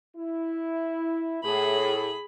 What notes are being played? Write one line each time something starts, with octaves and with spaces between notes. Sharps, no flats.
E4
A2 G#4 B5